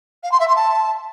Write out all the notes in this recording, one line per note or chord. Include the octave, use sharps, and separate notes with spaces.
F5
C6
E5
C6
A5